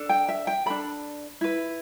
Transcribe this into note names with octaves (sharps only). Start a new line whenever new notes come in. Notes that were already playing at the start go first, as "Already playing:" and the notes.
Already playing: D4 A4
G5
E5
G5
D4 A4 B5
E4 B4